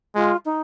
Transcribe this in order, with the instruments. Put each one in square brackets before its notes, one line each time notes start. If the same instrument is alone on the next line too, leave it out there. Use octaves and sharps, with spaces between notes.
[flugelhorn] G#3 [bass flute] F4
[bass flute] D#4